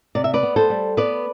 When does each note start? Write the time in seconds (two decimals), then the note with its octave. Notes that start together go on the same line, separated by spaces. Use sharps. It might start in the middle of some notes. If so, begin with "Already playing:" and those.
0.15 C3 D5
0.24 E5
0.33 B4 D5
0.43 B3
0.56 A4 C5
0.70 G3
0.97 B3 B4 D5